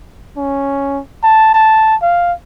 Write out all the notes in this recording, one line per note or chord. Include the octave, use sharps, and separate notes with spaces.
C#4
A5
A5
F5